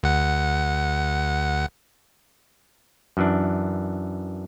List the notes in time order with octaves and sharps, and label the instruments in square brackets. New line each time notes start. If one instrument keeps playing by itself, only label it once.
[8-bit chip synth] D2 F#5
[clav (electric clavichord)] F#2 E3 D4